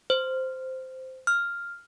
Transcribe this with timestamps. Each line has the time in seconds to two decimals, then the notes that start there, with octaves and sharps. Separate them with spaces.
0.10 C5
1.27 F6